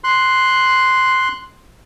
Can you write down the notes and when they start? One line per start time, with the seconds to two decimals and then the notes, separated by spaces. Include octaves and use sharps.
0.04 C6 F#6